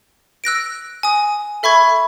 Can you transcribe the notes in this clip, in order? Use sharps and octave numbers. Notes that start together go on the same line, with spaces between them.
E6 F#6 A#6 D7
G#5 D#6
A4 E5 B5 C#6 G#6